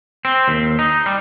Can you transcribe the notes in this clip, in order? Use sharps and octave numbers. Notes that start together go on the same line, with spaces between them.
C4
D#2
D#4
G3